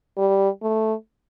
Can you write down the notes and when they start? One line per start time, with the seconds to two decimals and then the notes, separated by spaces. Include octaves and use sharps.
0.18 G3
0.62 A3